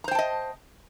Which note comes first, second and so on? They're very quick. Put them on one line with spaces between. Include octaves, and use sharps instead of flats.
A#5 C5 G5 A5 D#5